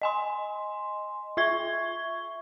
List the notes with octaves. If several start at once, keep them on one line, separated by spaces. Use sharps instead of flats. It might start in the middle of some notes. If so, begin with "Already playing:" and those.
D#5 G#5 C6
F4 E5 C#6 G#6 G7